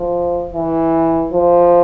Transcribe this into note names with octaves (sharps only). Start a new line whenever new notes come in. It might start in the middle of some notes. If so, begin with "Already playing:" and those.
Already playing: F3
E3
F3